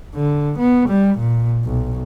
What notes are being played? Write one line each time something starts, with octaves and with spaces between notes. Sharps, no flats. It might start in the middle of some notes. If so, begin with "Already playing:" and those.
D3
B3
G3
A#2
B1